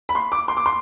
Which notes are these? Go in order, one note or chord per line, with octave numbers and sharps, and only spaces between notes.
B5
C6
D6
C6
D6
C6